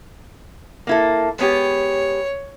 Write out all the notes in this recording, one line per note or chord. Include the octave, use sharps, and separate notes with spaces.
A#3 E4 A4
G#3 B3 G4 C#5